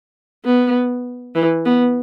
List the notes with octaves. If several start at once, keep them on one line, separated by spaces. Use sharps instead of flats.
B3
E3
B3